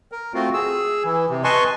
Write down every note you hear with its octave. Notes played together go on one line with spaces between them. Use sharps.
A#4
A3 C4 F4 F#4
G#4 E6
E3
C3
B4 D#5 G#5 A5 C6 C#6